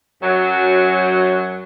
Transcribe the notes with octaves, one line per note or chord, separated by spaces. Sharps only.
F#2 F#3